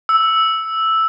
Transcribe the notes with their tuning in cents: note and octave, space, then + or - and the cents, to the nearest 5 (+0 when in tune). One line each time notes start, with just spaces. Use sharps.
E6 +0